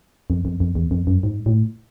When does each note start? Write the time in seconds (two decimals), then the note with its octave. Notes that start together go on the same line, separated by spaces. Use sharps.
0.30 F2
0.45 F2
0.60 F2
0.75 E2
0.91 F2
1.07 F#2
1.23 G#2
1.46 A2